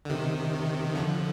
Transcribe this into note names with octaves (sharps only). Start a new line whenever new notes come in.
D3
C3 D#3
D3 F3